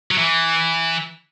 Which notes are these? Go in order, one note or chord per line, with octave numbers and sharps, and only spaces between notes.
F#3
E3